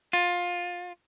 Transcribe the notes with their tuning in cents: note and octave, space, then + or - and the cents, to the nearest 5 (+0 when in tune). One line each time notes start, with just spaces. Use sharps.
F4 +20